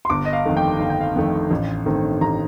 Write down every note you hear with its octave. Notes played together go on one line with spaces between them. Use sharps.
C6
G1 D6
D#5
F5
F2 D#3 A3
G5
G1 F5
G5
F5
F2 D#3 A3
A1
G2 D#3 A3 C4
A1 A#5